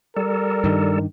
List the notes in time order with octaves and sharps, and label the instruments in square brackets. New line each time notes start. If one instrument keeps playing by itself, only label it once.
[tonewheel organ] G3 A4 [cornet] A#4
[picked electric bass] G2 D#3